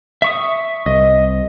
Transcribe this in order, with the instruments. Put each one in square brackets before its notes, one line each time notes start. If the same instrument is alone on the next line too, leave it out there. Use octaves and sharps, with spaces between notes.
[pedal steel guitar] E5 C#6 D#6
[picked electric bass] C2 [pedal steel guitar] D#5